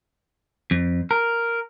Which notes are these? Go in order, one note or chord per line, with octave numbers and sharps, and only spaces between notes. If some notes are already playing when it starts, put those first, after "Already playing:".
F2
A#4